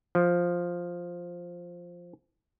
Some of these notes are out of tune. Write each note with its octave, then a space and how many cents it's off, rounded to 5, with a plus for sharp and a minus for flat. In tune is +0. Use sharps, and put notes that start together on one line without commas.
F3 +5